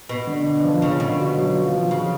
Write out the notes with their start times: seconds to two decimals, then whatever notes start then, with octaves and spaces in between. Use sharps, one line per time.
0.09 B2 B3
0.27 D3
0.46 D4
0.64 F3
0.82 C#3 C#4
1.00 B2 D3
1.18 F#4
1.37 F#3
1.54 F4
1.72 F3
1.91 C#3 F3